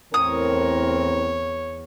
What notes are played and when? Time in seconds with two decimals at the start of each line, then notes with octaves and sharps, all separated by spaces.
0.14 E2 A2 C4 A#4 C#5 D#6